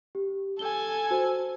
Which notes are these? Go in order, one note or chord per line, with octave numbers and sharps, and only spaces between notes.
G4
A4 G#5 G7
F#4 C5